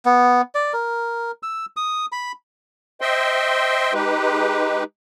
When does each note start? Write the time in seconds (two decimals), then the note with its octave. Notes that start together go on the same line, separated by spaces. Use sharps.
0.05 B3
0.55 D5
0.73 A#4
1.43 E6
1.77 D#6
2.12 B5
3.01 C5 D#5 E5 G5 C6
3.94 G#3 D#4 G4 B4